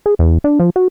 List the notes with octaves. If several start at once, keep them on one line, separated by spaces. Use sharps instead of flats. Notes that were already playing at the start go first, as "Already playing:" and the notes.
G#4
E2
D4
F3
F#4